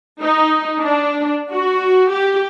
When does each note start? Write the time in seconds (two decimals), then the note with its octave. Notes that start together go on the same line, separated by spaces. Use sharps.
0.21 D#4
0.80 D4
1.52 F#4
2.12 G4